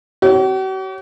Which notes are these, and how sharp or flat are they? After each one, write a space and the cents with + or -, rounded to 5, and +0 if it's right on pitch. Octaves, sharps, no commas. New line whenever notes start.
F#4 +45 C#5 +0